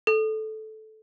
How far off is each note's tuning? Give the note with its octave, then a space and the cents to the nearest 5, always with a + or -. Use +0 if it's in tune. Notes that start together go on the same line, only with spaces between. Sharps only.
A4 -10